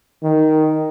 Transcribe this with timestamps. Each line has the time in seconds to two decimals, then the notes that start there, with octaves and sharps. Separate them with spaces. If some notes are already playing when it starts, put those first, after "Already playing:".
0.23 D#3